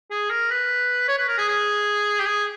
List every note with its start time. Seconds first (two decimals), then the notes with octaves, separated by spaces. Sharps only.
0.11 G#4
0.30 A#4
0.50 B4
1.08 C#5
1.18 B4
1.28 A#4
1.38 G#4
1.49 G#4
2.19 G4
2.26 G#4